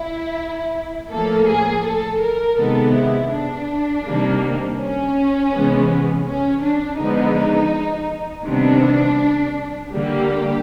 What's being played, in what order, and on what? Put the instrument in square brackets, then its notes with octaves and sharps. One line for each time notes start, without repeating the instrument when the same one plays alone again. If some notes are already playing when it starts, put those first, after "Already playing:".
Already playing: [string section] E4
A2 F3 A#3 A4
G#4
A4
A#4
C3 D#3 G#3 B3 A4
E4
D4
C3 D#3 G3 A#3
C#4
C3 E3 G#3 B3
C#4
D4
D3 F3 G#3 B3 D#4
C3 D#3 G3 B3 D4
D3 G3 A#3 G4